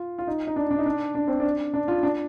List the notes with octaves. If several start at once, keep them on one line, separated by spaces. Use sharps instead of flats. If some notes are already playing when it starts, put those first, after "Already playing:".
Already playing: F4
F4
D#4
D#4
D4
D4
D#4
D4
D4
C4
D4
D4
F4
D4